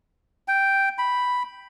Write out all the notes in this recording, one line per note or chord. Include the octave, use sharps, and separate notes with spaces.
G5
B5